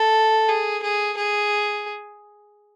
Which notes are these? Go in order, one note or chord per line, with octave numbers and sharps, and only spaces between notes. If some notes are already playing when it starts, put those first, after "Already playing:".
Already playing: A4
G#4
G#4
G#4